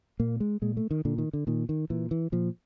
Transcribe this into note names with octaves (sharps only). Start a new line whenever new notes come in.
A#2 A#3
G#3
A#2 G#3
A3
D#3
A#2 D3
D#3
D3
A#2 D#3
D#3
A#2 E3
E3
A#2 F3